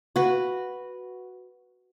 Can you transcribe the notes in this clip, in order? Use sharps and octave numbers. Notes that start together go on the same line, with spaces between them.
F#4 B4